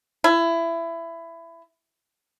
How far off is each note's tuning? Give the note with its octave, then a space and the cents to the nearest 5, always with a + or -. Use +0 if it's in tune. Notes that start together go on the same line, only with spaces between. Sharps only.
E4 +20